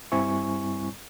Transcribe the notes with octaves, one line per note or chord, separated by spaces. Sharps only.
G2 G3 C4 E4 G#5 C#6